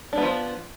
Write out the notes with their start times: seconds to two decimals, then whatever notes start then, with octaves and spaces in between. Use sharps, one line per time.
0.13 D4
0.18 B3
0.23 F3